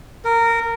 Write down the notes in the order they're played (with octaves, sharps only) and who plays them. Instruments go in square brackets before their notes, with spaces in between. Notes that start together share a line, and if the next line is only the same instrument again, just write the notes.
[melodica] A#4